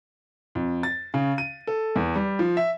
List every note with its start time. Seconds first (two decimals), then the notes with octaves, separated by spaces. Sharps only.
0.55 F2
0.83 A6
1.14 C#3
1.38 D#7
1.67 A4
1.96 E2
2.16 G3
2.39 F3
2.57 E5